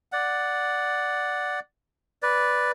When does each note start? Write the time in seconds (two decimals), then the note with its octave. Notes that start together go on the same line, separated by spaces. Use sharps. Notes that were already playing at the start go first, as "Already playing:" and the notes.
0.12 D5 F#5
2.22 B4 D5